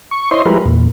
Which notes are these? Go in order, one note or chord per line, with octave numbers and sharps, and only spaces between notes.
C#6
E4 C5 C#5 D#5 C6
F3 G3 G#3 E4 A#4 B4
E2 A#2